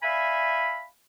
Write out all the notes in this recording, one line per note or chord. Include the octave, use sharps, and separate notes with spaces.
D5 E5 F5 G#5 B5